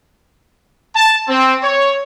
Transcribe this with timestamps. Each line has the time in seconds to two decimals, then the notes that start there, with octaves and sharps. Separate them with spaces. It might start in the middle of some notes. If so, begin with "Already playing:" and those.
0.96 A5
1.29 C4
1.63 C#5